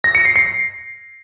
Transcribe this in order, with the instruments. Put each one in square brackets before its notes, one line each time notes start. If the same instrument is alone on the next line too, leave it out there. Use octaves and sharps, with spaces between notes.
[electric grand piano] A#6
C#7
C7
C7